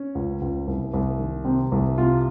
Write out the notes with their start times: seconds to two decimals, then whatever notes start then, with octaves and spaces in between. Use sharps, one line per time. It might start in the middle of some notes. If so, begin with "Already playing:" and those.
Already playing: C#4
0.15 C#2
0.41 C#2
0.67 C2
0.94 C2
1.19 D#3
1.45 C3 C4
1.72 C2
1.98 C3 F4